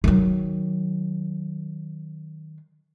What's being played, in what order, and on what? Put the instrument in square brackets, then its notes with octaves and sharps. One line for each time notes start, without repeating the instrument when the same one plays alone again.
[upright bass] D#3 F#3